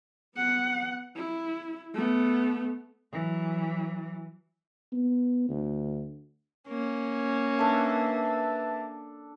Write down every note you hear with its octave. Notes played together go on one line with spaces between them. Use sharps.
B3 F#5
E4
A3 B3
E3 F#3
B3
D2
A#3 C#4
D4 A4 B4 E5 A5